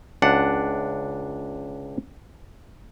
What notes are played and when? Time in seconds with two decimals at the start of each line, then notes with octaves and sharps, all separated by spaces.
0.22 C#2 D4 F#5